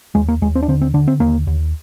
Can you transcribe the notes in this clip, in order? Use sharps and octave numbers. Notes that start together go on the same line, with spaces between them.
D#2 G#3
A#3
D#2 G#3
C4
D4
D3 C4
C4
D3 D4
C4
D#2 A#3
D#2